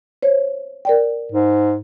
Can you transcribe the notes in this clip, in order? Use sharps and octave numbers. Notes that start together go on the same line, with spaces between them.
C5 C#5
A#4 D5 G5
G#2